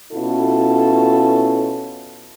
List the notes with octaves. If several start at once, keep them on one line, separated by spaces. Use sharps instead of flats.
B2 C#4 E4 F4 A4